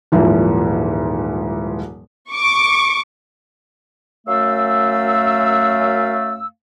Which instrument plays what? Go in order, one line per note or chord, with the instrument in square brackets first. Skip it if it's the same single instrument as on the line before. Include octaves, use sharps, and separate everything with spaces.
[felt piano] D#1 G#2 E3 F3
[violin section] C#6 D6
[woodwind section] F#2 A3 F5 E6